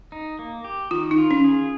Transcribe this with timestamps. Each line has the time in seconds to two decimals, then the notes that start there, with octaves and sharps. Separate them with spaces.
0.12 D#4
0.39 A#3
0.64 G4
0.91 D#3 F4
1.11 D#4
1.18 F4
1.31 C#4
1.44 G#4